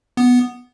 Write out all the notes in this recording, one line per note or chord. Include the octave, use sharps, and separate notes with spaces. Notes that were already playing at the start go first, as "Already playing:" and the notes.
B3